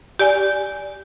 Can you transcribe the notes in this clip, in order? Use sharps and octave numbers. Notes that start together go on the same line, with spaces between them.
G4 D5 G#5